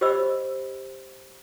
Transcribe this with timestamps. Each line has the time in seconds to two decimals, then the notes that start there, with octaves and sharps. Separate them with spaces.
0.01 G4 C5 D5 D#5 B5 E6